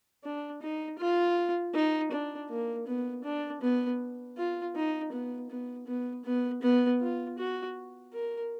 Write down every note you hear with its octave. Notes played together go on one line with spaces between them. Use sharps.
D4
D#4
F4
D#4
D4
A#3
B3
D4
B3
F4
D#4
B3
B3
B3
B3
B3
F4
F#4
A#4